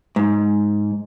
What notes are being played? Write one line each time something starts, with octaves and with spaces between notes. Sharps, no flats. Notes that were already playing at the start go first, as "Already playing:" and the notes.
G#2